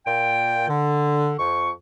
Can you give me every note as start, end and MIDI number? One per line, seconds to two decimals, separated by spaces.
0.06 0.67 46
0.06 0.67 79
0.68 1.32 50
1.39 1.70 41
1.39 1.70 85